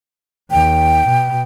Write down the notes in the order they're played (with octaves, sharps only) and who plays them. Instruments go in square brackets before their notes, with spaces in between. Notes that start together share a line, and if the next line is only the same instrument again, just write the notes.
[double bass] D#2 [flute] G5
[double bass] B2